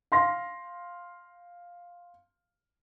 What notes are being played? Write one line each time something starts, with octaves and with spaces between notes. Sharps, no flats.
F5 C6 A#6